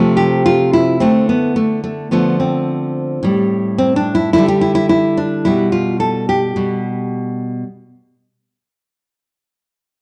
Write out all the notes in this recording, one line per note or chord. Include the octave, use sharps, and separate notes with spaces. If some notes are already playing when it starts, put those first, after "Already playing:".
Already playing: C3 F3 A3
G4
F4
E4
D3 A3 C4
B3
A3
A3
D3 F3 A3 B3
C4
A2 G3
C4
D4
E4
D3 G3 E4
G4
E4
E4
E4
D4
B2 G3 E4
F4
A4
G4
B2 G3